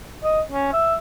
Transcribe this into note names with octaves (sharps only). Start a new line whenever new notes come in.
D#5
C#4
E5